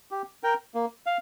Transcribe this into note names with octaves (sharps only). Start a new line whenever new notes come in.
G4
A#4 G5
A#3
F5